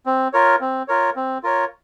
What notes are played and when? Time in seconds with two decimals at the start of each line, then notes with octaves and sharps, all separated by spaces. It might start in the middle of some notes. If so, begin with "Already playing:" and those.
0.06 C4
0.33 F4 A#4 C#5
0.61 C4
0.88 F4 A#4 C#5
1.16 C4
1.43 F4 A#4 C#5